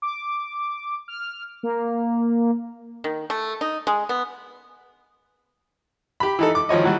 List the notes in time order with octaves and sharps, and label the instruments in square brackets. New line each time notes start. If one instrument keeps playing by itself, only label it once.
[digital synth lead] D6
F6
A#3
[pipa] D#3
A3
D#4
G#3
B3
[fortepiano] G4 B5
E3 D#4 A4
D6
G#1 F3 C#5 D#5
E3 F#3 G3